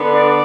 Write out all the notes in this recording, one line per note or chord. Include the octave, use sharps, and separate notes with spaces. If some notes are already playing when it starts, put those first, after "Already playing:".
Already playing: D3 B3 D4
D5